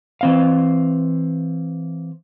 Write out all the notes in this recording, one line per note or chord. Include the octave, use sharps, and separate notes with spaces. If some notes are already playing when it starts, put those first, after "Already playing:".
E3 C4 F5